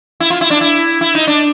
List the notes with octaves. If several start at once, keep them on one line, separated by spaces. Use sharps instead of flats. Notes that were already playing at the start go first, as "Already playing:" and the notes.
E4
F4
E4
D4
E4
E4
D#4
D4